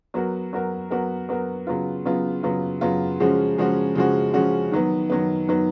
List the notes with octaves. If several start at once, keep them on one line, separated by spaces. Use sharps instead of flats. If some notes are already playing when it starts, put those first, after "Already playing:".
F#3 B3 F#4 A#4
F#3 B3 F#4 A#4
F#3 B3 F#4 A#4
F#3 B3 F#4 A#4
C#3 F#3 B3 F4
C#3 F#3 B3 F4
C#3 F#3 B3 F4
C#3 F#3 B3 F4
C#3 F3 G#3 C#4 F#4
C#3 F3 G#3 C#4 F#4
C#3 F3 G#3 C#4 F#4
C#3 F3 G#3 C#4 F#4
D#3 F#3 B3
D#3 F#3 B3
D#3 F#3 B3